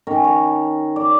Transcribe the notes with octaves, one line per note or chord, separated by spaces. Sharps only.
D#3 C#4 A#4
C#5
D5